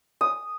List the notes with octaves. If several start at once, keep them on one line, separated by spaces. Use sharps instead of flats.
D#6